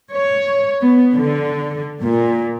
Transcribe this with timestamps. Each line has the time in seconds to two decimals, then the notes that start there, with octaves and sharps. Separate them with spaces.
0.14 C#5
0.81 B3
1.15 D3
2.01 A#2